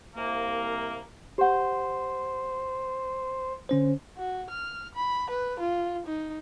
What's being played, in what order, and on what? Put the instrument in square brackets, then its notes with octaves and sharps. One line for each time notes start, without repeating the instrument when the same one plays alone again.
[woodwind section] C2 A#3
[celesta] G4 F#5 [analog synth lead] C5
[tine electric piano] D3 C#4 C5
[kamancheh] F#4
F6
B5
B4
F4
D#4